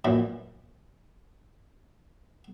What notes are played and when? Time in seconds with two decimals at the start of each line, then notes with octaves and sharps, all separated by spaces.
0.05 F#2 A#2 E3